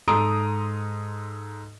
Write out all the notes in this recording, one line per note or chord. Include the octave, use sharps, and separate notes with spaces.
G#2 A4 A#5 C6 D#6 D7